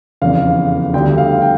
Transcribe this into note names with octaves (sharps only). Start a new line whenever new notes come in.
F1 E2 C#3 F5
D2 D3 G3 G5
F5
G5